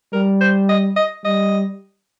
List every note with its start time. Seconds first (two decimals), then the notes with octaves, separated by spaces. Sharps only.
0.13 G3 A#4
0.41 C5
0.69 D#5
0.96 D#5
1.25 G3 D#5